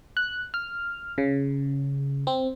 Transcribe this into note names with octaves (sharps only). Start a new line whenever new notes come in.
F#6
F6
C#3
C4